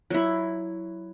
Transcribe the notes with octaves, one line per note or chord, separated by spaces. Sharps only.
F#3 E4